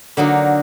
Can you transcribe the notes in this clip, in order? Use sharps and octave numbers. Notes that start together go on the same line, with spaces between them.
D3 F#3 A#3 D#4